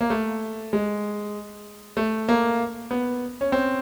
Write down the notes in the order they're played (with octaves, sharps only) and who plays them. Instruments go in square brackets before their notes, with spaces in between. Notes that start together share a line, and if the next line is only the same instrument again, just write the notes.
[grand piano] A#3
A3
G#3
A3
A#3
B3
C#4
C4